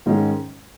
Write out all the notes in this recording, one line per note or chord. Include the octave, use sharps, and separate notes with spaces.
G#2 D#3 G#3 C#4